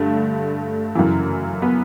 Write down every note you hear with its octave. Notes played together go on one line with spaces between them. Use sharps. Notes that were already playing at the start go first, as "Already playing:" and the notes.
Already playing: G2 D3 A3
F#2 C#3 E3
B3